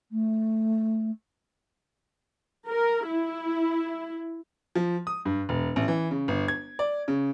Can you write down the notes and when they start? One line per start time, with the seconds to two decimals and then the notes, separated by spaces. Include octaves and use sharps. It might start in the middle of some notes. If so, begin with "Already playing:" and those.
0.12 A3
2.68 A#4
3.07 E4
4.75 F3
5.07 D#6
5.25 G2
5.49 E1
5.76 A1
5.88 E3
6.11 C#3
6.28 G1
6.48 G#6
6.79 D5
7.08 C#3